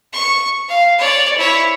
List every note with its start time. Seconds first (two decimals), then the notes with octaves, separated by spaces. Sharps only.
0.13 C#6
0.69 F5
0.98 C#5 D5
1.38 E4 C#5